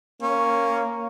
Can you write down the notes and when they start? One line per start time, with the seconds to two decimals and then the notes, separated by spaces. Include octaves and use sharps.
0.22 A#3 C#4